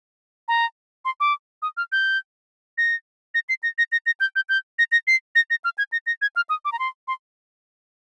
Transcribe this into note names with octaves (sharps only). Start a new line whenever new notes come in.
A#5
C6
D6
D#6
F6
G6
A#6
A#6
C7
A#6
A#6
A#6
A#6
G6
G6
G6
A#6
A#6
C7
A#6
A#6
F6
G#6
A#6
A#6
G#6
F6
D#6
D6
A#5
C6
C6